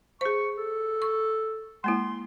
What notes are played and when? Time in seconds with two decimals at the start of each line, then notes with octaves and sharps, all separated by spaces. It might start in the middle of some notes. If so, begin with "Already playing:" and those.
0.21 G#4 C5 C#6
0.57 A4
1.02 C#6
1.84 G#3 A#3 E4 C6